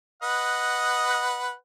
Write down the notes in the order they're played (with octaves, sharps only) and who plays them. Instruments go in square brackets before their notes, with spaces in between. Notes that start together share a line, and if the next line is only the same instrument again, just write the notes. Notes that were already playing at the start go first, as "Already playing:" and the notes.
[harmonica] B4 D#5 F#5